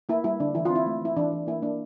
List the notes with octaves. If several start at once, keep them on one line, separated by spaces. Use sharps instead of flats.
A#3 E4
G3 E4
D3 D4
E3 E4
F4
C4
E4
A3
E3 E4
E3 D4
E3
A#3 E4
A#3 D4